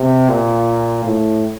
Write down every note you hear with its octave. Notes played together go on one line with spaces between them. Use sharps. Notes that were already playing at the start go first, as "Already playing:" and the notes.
Already playing: C3
A#2
A2